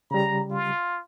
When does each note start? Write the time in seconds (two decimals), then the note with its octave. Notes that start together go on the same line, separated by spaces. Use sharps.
0.11 C#3 G3 A#5
0.50 F4